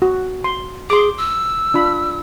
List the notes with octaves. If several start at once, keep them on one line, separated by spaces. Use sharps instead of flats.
F#4
C6
G#4 C6 D6
E6
D4 F4 B5